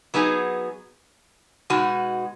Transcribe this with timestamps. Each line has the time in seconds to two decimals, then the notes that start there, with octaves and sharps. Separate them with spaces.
0.14 F#3 B3 D#4 G#4
1.70 B2 G#3 D#4 F#4